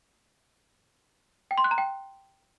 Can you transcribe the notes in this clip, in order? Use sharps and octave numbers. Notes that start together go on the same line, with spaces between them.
G5
C6
F#6
A#5
G5